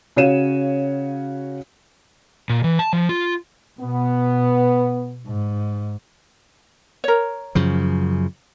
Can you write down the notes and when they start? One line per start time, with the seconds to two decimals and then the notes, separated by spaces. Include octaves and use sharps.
0.16 C#3 F#4 C#5 F5 D#7 E7
2.49 A#2
2.64 E3
2.79 A5
2.93 F3
3.09 F4
3.80 B2 B3
5.27 G#2
7.04 A#4 C#5
7.55 F#2 C#3 F3